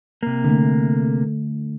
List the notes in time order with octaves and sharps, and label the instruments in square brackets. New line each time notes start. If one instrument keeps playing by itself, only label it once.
[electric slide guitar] C3 A#3
[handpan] D3 A3